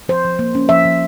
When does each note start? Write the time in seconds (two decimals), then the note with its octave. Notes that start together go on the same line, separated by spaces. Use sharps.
0.09 F3 C5
0.24 F3
0.39 A#3
0.55 C#4
0.69 F3 E5
0.85 F3